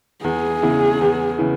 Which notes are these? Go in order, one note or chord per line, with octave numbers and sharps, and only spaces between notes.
E2 G#4
C#3 E3 B3 E4
E2
C#3 E3 B3 E4